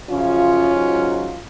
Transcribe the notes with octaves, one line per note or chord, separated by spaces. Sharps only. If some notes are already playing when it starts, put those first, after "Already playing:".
F#2 C#3 F3 C#4 F4
G#2 F#3